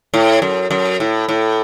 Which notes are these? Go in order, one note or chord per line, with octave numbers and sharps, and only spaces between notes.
A2
F#2
F#2
A2
A2